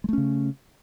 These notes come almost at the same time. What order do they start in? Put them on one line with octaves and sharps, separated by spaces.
G#3 A3 C#4 C#3